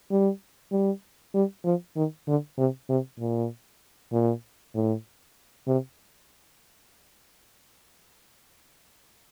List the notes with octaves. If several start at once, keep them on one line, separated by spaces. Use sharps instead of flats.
G3
G3
G3
F3
D#3
D3
C3
C3
A#2
A#2
A2
C3